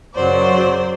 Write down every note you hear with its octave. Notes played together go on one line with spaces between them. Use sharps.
F#2 C#3 F#3 C5 D5